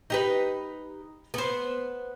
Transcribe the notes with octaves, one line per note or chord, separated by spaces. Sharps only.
D#4 G4 B4
B3 C5